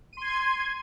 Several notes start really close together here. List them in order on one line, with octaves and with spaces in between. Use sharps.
D#7 C6 G#6